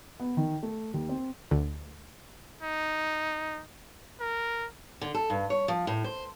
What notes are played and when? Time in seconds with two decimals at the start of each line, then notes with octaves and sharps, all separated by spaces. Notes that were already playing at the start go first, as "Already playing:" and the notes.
0.20 B3
0.37 D#3
0.63 A3
0.94 D#2
1.09 C4
1.51 D2
2.62 D#4
4.20 A#4
5.01 D3
5.14 A4
5.30 G2
5.50 C#5
5.68 F3
5.87 A2
6.04 C5